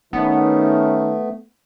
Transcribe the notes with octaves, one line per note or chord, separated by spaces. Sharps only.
D#3 A3 B3 C#4